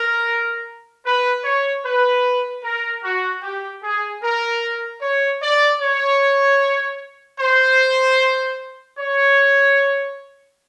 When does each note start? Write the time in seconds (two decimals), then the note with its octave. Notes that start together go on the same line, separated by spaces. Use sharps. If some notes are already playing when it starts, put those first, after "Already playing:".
Already playing: A#4
1.06 B4
1.44 C#5
1.85 B4
2.63 A#4
3.04 F#4
3.43 G4
3.83 G#4
4.23 A#4
5.02 C#5
5.42 D5
5.81 C#5
7.39 C5
8.99 C#5